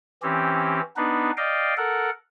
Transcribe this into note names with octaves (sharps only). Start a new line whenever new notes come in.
E3 C4 C#4 G4
B3 D4 D#4 B4
D5 D#5 F5 G5
A4 A#4 F#5